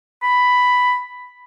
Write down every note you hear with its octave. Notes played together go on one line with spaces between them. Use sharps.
B5